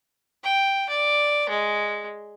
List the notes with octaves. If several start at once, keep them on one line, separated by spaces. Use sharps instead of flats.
G5
D5
G#3